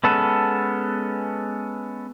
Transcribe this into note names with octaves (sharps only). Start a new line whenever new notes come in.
G#3 B3 C#4 A4